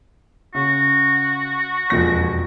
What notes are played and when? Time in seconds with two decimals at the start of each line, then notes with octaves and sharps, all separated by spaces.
0.54 C#3 F#4
1.90 E1 F2 A#6